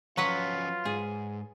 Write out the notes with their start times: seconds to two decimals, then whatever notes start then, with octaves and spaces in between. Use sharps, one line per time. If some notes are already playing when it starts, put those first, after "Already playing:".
0.17 F3 F#3 C#4 F4 B4 F#5
0.85 G#2 G#4